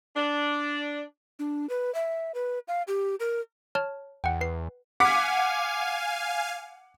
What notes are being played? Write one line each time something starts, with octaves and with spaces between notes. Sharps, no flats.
D4
D4
B4
E5
B4
F5
G4
A#4
C#5 A5 F6
E2 F#5 G5
B4 C7
F5 F#5 G#5 D6 B6